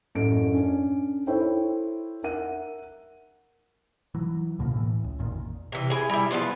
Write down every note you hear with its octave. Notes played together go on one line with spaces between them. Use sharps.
A1 F#2 A3 D7
C#4 D4
E4 A4 C5 C#5 G5
A#4 E5 F#5 D#7
E3 F#3
C#2 B2 D3 A#3
A2 E3
C#2
A1 F2 A#2 D#3
C3 E3
E4 G#4 G#5
G3 E4
F3 F#3 B3 F4